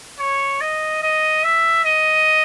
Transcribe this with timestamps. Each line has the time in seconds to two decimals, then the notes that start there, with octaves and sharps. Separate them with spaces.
0.19 C#5
0.61 D#5
1.02 D#5
1.43 E5
1.85 D#5